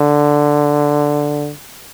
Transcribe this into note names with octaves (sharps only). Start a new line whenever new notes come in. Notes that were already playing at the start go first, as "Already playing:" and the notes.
Already playing: D3